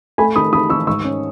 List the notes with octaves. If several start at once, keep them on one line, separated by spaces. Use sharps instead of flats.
A3 G#5 B5
D#3 B5 D#6
D#3 B5 D#6
D#3 C#6 E6
G#2 C#6 E6
C#4